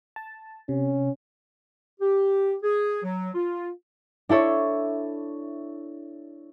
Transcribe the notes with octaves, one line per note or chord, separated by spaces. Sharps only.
A5
C3 C#4
G4
G#4
F#3
F4
D4 E4 A4 C#5